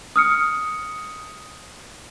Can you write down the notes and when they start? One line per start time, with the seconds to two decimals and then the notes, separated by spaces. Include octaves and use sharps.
0.16 D#6 F6 C#7